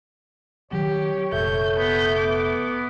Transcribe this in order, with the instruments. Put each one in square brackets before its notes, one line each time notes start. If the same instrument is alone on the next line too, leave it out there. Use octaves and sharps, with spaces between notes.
[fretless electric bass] D#3 F#3 C4 [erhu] G4 [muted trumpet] C#5
[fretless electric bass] F1 A#2 [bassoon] A3 [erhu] G6
[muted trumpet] B3 [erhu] G6
[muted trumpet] B3 [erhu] D6